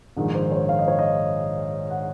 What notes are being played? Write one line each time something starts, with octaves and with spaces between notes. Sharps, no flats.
A#1 G#2 D#3
C5
C#5
F5
D#5
C#5
D#5
F#5